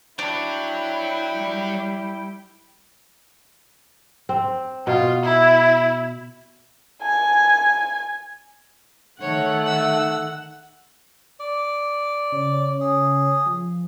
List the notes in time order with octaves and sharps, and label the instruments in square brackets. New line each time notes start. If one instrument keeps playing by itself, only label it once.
[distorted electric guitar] F#3 [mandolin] D4 [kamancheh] E4 G5
[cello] G3
[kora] C4
[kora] B2 [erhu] F4
[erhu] E4
[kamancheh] G#5
[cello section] D#3 [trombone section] A3 [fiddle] C#5 [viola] F#5
[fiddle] E6
[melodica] D5
[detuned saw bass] C#3 [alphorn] C#5
[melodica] G#4
[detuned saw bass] F3